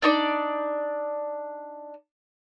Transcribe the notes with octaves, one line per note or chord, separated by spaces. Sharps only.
D4 D#4 D5